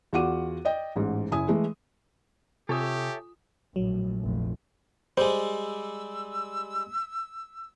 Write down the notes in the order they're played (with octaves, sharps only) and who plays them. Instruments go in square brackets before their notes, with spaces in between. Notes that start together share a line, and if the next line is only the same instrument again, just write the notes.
[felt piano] E2 F4 F#4 F#5 D6 D#7
D5 D#5 G5
A1 G#2
F#1 E4 G#5 D#6
E3 G#3 A3
[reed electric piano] C3 [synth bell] F4 G#5 D#6 [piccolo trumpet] G4 [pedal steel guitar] A4 C#5 E5
[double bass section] A#1 A2 [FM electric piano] F#3
[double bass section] F1 A#1 F2
[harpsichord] G3 G#3 [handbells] C5 [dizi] E6